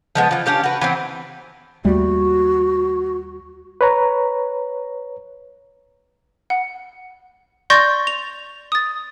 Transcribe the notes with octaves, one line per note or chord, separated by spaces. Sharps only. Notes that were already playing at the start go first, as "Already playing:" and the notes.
F3 G#3 B3
E3 F3
C#4 D4 G4 F5
F#4 B4
E3 B3 C4
D#2 G3 A3 F#4
B4 C#5 A#5
F#5
D5 C6 C#6 G6 A6 A#6
F7
D#6 A6